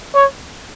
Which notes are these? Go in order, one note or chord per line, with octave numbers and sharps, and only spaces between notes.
C#5